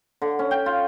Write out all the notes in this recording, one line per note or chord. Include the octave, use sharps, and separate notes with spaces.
D3
C#4
G5
F4